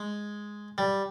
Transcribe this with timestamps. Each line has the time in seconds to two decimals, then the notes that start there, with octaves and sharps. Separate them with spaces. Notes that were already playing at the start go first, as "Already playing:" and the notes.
Already playing: G#3
0.78 G3